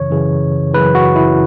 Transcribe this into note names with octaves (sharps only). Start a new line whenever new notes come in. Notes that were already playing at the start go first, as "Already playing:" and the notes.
Already playing: F#2 C#3 E3 C#5
F#2 C#3 E3
F#2 C#3 E3 B4
F#4
E4